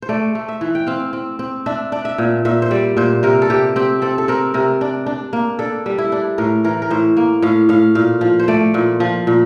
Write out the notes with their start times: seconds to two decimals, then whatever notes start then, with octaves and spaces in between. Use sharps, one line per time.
0.02 C5
0.09 A3 D5
0.35 A3
0.49 E5
0.61 E3
0.75 G5
0.87 C4 F5
1.13 C4
1.39 C4
1.66 D4 E5
1.92 D4
2.05 E5
2.18 A#2
2.45 A#2 E5
2.62 C5
2.71 G3 D5
2.97 A#2 C5
3.23 C3 A#4
3.42 A4
3.50 C3 G4
3.76 C4 G4
4.02 C4 A4
4.18 A4
4.28 C4 A#4
4.54 C3 A#4
4.81 D4
5.06 D4
5.33 A#3
5.59 D4 A4
5.86 G3
5.98 E4
6.12 D4
6.38 A2 A#4
6.64 E3 A#4
6.82 A#4
6.90 A2 C5
7.17 A#3
7.42 A2 F5
7.69 A2 F5
7.95 A#2 F5
8.21 F3
8.40 C5
8.48 A3 D5
8.74 A#2
9.00 F3
9.27 A#2